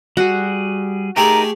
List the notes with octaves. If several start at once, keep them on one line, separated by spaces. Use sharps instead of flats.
G3 F#4 G#4
A3 D#4 G4 G#4 A#4 A#5